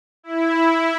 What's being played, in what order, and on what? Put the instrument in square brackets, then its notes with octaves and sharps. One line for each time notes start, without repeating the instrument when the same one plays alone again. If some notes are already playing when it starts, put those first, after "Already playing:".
[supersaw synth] E4